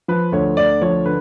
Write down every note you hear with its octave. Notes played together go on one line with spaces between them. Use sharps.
F3 B4
D2 C#5
D2 D5
F3 C#5
D3 B4